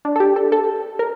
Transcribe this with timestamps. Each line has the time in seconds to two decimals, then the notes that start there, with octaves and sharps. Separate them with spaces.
0.05 D4
0.16 A4
0.20 G4
0.36 A4
0.52 A4
0.99 A#4